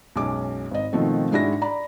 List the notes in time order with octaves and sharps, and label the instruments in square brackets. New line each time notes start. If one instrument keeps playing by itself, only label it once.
[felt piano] B1 F#2 G#3 C#4 D6
G#1 D#5
B2 D#3 F3 A3 C4
G#2 G#3 D4 E4 F#4 A#6
D5 A#5 B5